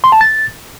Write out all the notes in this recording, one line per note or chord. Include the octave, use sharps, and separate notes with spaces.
C6
A5
A6